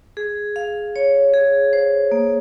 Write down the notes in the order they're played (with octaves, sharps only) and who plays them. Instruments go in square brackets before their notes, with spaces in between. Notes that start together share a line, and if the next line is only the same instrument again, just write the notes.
[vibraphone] G#4
F5
C#5
G#4
C5
A#3